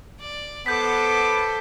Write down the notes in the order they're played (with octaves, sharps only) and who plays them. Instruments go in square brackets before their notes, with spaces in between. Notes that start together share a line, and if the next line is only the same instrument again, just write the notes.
[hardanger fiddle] D5
[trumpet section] B3 D6 [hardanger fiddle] A4 C5 [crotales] G6 B6